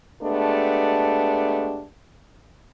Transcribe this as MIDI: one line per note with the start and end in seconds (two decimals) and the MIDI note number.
0.22 1.85 56
0.22 1.85 57
0.22 1.85 59
0.22 1.85 62
0.22 1.85 67